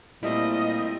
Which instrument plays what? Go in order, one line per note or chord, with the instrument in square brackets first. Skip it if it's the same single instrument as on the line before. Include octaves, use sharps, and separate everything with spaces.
[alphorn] A#2 [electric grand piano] G3 A3 C4 [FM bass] E4 [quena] D#5